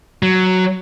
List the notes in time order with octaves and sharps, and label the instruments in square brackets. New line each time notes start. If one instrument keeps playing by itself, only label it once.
[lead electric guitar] F#3